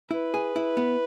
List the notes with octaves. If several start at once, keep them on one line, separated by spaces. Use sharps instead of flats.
E4 B4
G#4
E4
B3